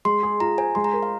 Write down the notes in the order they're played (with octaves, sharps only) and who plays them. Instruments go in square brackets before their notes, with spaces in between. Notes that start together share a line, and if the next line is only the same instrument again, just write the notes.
[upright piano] G#3 [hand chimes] C6
[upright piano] G#4
[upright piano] F4 [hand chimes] A#5
[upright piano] C5 [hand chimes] G#5
[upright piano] G#3 [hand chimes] C6
[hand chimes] A#5
[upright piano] A#4
[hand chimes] F5